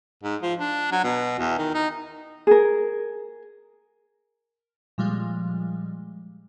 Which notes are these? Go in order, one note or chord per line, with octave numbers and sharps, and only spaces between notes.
G#2
F3
D4
F#3
B2
E2
D#3
D#4
G#4 A#4
A#2 F3 G3 G#3 F5